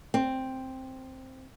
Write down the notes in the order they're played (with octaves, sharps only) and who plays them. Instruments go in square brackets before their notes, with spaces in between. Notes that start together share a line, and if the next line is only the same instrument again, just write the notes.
[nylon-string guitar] C4